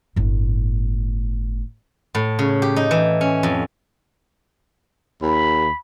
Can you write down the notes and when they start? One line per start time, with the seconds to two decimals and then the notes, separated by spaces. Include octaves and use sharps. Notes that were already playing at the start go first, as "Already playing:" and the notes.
0.16 G1 A2
2.15 A2
2.39 C#3
2.62 G4
2.76 D#4
2.91 E3
3.21 C#4
3.43 F2
5.22 D#2 B5